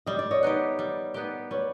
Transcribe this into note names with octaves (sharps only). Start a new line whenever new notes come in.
G3 D#5
D5
C#5 D#5
B3 D#4 G4
G3
B3 D#4 G4
G3 B4 C#5